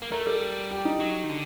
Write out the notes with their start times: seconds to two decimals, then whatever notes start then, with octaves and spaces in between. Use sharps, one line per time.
0.02 A#3
0.12 A3 A#4
0.26 G3 A4
0.71 G4
0.85 D#4
1.00 F#3
1.24 D#3
1.30 D3